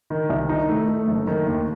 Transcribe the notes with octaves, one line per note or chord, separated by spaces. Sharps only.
D#3
C2
D#4
A3
A3
F#1
D#3
D#2